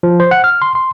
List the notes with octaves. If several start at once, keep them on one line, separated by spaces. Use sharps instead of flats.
F3
C5
F#5
F6
C6
C6